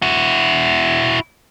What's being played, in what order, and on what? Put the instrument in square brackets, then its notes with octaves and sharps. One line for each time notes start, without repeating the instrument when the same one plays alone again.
[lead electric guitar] E4 F#4